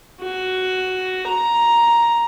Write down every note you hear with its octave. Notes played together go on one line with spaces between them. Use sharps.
F#4
A#5